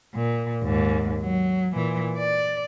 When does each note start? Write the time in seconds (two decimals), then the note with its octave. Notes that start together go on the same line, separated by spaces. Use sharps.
0.15 A#2
0.63 D#2 G#2
1.21 F#3
1.74 A#2 E3
2.18 D5